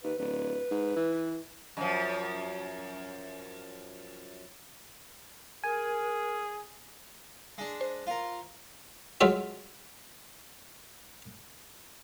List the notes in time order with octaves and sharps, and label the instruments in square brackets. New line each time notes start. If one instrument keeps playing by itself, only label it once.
[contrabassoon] D#2 [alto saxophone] B4
[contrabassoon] D1 [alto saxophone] B4
[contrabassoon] G#2
E3
[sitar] F#2 F3
[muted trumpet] G#4 [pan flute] A#4 [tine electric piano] G#5
[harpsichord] G#3 D4
[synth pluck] C5
[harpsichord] F4 A#4
F#3 G#3 F4 E5